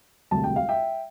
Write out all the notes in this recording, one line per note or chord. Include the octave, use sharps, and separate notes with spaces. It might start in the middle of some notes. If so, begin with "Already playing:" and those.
E1 D2 C3 G3 A5
G5
F5
E5 G5